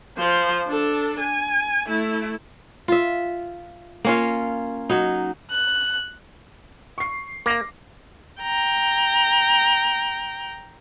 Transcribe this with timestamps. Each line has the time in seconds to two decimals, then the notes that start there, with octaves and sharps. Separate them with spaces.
0.18 F3 C5
0.68 D4 A4
1.21 G#5
1.88 A3 E4
2.88 F4 E5
4.04 A#3 C#4 F4
4.89 F#3 D#4
5.51 F#6
6.98 C#6 C7
7.46 A#3 D6 A#6
8.42 G5 A#5